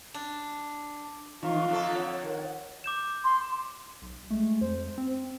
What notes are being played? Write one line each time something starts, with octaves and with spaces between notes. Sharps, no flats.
D4
F2 E3 D#4 F4 C#6
F2 D3 A4 F5
C#5 F#5
D#3
D6 G6 E7
C6
B1
G#3 A3
F2 C5
C4